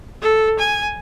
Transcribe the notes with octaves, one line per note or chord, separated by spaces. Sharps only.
A4
G#5